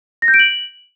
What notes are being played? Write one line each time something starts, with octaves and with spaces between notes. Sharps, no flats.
A#6
G6
D7
F#7